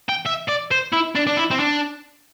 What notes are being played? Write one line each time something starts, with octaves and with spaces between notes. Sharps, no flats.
G5
E5
D5
C5
E4
D4
D4
E4
C4
D4